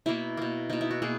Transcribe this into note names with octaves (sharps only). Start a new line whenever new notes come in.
B2 A#3 E4
B2 A#3
B2 A#3 D#4
E4
F#4
B2 A#3 G#4